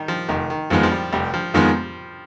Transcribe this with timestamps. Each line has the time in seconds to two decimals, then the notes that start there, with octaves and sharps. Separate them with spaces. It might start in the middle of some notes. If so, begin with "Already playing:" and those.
Already playing: D#3 G3
0.08 F3
0.29 F1 D#3
0.50 D#3
0.70 F2 D#3 F3 G#3 B3
0.83 F3
0.91 G3
1.12 F1 G3
1.34 F3
1.54 F2 D#3 F3 G#3 B3